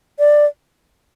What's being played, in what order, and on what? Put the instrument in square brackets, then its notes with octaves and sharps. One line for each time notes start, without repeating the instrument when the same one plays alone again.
[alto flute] D5